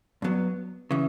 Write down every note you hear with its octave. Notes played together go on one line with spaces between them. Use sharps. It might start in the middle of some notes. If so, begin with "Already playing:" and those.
G2 F#3 B3
C#3 E3